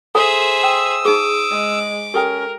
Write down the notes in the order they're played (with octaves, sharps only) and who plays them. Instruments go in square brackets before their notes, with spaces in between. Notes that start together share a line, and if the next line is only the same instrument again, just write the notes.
[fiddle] G#4 E5 [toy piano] A4 G#5 [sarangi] C5
[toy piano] G5 [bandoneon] D#6 E6
[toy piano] D#4 G#4 [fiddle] D6
[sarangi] G#3
[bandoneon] C#4 [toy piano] G4 A4 G5 [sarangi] A#4